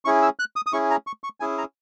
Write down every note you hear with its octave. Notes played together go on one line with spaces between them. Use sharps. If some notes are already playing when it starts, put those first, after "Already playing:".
C#4 E4 G#4 C#6
E6
F#6
D#6
D#6
C#4 E4 G#4 C#6
A#5
C#6
C#6
C#4 E4 G#4 G#5
A#5